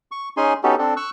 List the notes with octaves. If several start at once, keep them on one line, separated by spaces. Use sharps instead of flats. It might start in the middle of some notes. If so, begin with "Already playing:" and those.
C#6
C#4 D#4 G#4 G#5 C6
B3 C#4 D#4 F#4 G4 A4
C4 D4 A4
C#6 E6 F#6